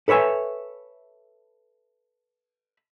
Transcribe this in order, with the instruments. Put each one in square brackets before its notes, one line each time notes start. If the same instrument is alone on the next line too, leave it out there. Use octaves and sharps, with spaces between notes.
[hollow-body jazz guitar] A4 B4 C#5 E5 G#5